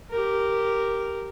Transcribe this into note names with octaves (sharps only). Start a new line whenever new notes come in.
G4 A#4